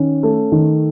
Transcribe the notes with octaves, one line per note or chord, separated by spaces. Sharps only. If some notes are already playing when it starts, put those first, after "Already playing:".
Already playing: D#3 C#4
A3
D#3